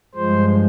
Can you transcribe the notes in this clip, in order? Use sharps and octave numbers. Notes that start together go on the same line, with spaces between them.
G2 F3 G#3 C5